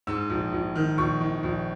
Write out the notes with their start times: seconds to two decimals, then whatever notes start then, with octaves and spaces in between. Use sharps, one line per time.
0.07 G#2 E6
0.30 A#1
0.53 A#1
0.75 D#3
0.98 A#1 C#6
1.21 D#3
1.43 A#1